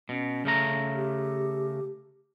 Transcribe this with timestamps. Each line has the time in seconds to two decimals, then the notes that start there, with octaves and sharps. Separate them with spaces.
0.09 B2 C#4
0.45 C#3 A3 A#5
0.94 G4